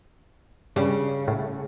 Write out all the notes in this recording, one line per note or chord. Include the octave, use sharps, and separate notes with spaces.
G2 C#3 G3
A2